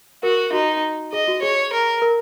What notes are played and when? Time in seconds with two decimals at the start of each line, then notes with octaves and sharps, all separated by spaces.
0.23 F#4 A#4
0.53 D#4 F#4
1.12 G#4 D#5
1.28 F#4
1.42 G#4 C#5
1.73 A#4
2.02 A#4